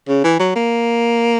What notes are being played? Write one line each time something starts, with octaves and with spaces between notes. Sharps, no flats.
C#3
E3
F#3
A#3